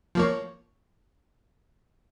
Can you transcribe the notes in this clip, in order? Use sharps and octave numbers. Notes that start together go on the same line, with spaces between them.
F3 A#3 C#5